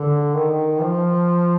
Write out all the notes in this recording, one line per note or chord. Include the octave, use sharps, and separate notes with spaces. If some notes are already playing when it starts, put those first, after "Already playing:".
Already playing: D3
D#3
F3